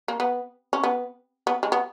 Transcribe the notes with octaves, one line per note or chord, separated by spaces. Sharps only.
A#3
B3
C#4
B3
B3
G#3
B3